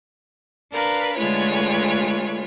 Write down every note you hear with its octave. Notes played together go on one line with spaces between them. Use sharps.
D4 A#4 B4 F5 B5
D3 G#3 A3 F4 B4 C#5